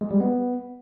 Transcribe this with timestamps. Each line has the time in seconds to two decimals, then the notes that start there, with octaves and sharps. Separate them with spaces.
0.01 G#3
0.11 G3
0.20 B3